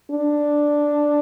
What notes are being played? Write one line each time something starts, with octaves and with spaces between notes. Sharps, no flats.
D4